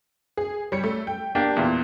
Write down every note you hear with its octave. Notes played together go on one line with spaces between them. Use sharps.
G#4
G3 C#5 C#7
A3
G5
A#3 D4 G4
E2 A#2